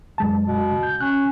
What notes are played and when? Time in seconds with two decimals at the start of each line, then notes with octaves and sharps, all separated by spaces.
0.18 F#2 G#3 A5
0.46 B2
0.83 G6
1.01 C#4 F#6